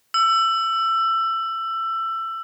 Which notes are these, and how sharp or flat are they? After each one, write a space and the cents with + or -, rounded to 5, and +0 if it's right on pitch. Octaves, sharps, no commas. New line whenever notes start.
E6 +20